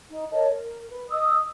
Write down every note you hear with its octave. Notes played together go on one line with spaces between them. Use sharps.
D#4
A#4 C#5 D#5 A5
A#4
B4
D#5 D#6 E6